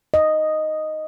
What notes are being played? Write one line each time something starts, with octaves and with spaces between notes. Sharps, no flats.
D#5